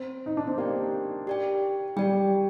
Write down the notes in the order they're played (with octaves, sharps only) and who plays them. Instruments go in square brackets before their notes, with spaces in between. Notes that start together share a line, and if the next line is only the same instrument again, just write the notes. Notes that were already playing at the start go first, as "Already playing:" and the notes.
Already playing: [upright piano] C4
D#4
D4
C4
[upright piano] A#3 [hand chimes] G4 D5 G5
[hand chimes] G4 D5 G5
[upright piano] G3 [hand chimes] G4 D5 G5